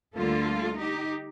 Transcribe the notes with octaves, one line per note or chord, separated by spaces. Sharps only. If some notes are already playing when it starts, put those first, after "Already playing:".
D2 D3 G3 A#3 F4 A4
D#4 G4